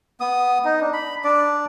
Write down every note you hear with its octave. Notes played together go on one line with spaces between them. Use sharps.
B3 D#6
D#4
D4
B5
D4 D5